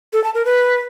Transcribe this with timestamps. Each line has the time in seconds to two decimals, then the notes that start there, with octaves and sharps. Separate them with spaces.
0.13 A4
0.24 A5
0.35 A#4
0.45 B4